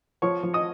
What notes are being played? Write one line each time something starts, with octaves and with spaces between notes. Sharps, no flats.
F3 C#5 C#6
F3
D#5 D#6